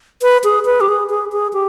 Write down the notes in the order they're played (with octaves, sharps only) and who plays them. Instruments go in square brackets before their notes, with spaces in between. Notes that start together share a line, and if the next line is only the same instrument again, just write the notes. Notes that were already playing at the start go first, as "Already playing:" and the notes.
[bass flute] B4
G#4
B4
G4
G#4
G#4
G#4
G4